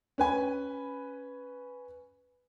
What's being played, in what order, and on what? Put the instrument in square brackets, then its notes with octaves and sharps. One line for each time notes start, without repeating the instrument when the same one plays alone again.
[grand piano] C#4 B4 G#5